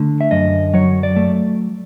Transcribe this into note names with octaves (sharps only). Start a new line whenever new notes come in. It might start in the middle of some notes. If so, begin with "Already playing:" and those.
Already playing: D3 A3
E5
F#2 D#5
F#3 C#5
D5
A3